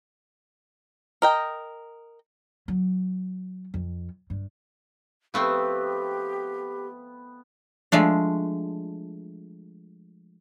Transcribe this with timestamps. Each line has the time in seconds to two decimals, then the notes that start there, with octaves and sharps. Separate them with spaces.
1.22 A#4 D#5 G5
2.68 F#3
3.74 F2
4.30 G2
5.34 F3 A3 B3 C4 G4
7.92 F3 G#3 A3 D4